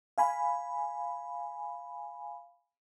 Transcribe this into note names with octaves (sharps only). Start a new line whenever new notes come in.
F5 G#5 B5